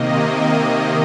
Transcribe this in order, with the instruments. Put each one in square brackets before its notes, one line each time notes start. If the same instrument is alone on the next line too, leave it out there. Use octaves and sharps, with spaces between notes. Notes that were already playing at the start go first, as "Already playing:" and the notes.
Already playing: [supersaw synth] C3 D#3 A#3 D#5